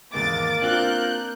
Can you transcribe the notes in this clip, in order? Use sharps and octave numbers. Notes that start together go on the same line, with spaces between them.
G#1 E2 G#3 A#3 A#4 D6 A6
C4 D4 F4 F#6 G6